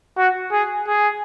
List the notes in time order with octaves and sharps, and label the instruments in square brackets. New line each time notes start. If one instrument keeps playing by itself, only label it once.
[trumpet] F#4
G#4
G#4